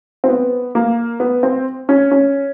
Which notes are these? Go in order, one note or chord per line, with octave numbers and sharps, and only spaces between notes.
C4
B3
A#3
B3
C4
C#4
C#4